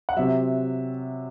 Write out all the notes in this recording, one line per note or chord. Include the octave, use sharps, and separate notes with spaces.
F#5
C3 F#3 E5